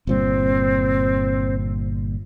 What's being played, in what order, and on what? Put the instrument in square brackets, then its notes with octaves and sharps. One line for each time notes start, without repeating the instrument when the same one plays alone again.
[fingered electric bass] G1 A#2 G3 [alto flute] C4